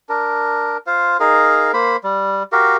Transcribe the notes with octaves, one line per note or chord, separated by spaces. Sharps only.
D4 A#4
F4 C5 F5
D#4 G#4 A#4 F5
A#3 C5 B5
G3
F#4 G4 A#4 F5